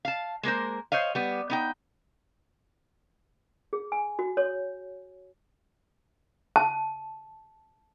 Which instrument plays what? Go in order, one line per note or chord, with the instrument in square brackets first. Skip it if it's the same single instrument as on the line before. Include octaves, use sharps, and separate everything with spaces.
[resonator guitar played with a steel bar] F5 A5
G#3 A#3 A#4 C5
C5 C#5 D#5 F5
G3 B3
B3 D#4 G5
[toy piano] G#4
G#5
F#4
C#5
A5